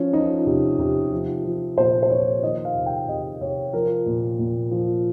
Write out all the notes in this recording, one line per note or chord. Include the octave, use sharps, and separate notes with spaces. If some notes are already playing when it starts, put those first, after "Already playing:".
Already playing: F3 C#4
F3 D#4
C3
C3
F3
F3
A#2 C5
C5
F3 C#5
D#3 D#5
F5
C3
G5
C3 D#5
C3 C#5
F3 A#4
A#2
A#2
F3